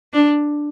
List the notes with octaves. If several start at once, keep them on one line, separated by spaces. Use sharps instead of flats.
D4